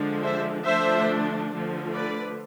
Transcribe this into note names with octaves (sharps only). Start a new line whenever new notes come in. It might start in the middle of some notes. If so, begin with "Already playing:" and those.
Already playing: D3 F3 G#3 D4
C5 E5
D3 F3 A3 D4 C5 E5
D3 F3 A3
B4 D5